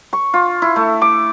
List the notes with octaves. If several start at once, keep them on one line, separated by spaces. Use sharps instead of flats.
C#6
F4
E4
A3
D6